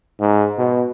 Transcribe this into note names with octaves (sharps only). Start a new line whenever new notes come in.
G#2
B2